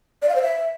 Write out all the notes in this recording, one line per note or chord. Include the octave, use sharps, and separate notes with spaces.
D5
F5
C5
E5